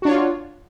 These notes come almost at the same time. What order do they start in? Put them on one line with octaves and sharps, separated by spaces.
F#4 D4 C#5 F4